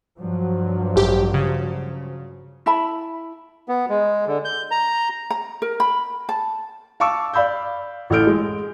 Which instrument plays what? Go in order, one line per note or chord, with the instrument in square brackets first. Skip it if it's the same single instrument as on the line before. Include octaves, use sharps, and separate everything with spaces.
[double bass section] G2 F3 F#3
[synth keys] A1 G4
C#3
[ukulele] E4 E5 A5 B5
[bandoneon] B3
G#3
D3
G6
A#5
[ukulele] A#5
A#4
B5
A5
[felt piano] F5 A5 C#6 D6 E6
D5 F5 B5 E6 G6
A1 E3 A4 F6 G6 D7
G#3